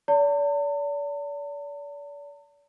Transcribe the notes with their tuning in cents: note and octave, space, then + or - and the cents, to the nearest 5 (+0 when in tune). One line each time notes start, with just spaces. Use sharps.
D5 -40 A5 +45